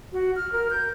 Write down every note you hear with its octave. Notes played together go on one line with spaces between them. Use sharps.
F#4
F6
A#4
G6